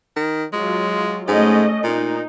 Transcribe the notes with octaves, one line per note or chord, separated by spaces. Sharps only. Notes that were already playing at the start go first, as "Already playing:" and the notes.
D#3
F#3 G#3 F4
G#2 A3 C#4 D#5
A#2 D#4